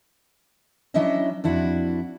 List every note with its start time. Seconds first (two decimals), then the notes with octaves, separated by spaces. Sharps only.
0.94 F#3 C#4 D4 E4 D#5 E5
1.44 F2 D4 E4 F#4